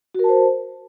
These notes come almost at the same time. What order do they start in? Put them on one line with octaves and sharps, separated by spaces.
F#4 A#4 A5 C5